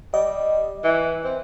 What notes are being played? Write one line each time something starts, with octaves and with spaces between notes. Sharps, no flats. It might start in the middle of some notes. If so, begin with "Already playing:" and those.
G3 D#5
E3
C4